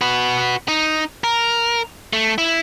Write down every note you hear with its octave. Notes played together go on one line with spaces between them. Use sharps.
F#4 B4
D#4
A#4
A3
E4